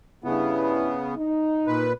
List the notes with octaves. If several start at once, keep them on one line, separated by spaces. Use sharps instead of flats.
G2 C#3 B3 E4
D#4
A#2 B4